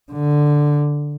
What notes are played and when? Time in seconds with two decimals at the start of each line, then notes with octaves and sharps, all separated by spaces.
0.12 D3